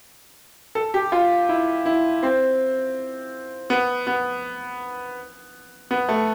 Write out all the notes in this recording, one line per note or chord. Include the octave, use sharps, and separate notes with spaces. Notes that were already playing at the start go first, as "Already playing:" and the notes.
A4
G4
F4
E4
E4
C4
B3
B3
B3
A3